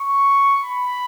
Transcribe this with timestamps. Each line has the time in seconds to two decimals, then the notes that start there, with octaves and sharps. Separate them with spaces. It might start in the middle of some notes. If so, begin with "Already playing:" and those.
Already playing: C#6
0.63 B5